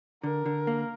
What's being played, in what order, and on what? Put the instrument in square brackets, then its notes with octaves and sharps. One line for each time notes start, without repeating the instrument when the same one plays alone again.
[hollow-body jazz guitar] D3 [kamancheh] A#4
[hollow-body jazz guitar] D3
A#3